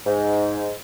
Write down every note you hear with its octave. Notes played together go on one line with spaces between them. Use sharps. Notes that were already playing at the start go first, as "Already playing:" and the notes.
G#2